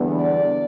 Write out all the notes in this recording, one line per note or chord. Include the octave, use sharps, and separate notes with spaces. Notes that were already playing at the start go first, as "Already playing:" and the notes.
Already playing: E2 D3 G3 B3 D4
D5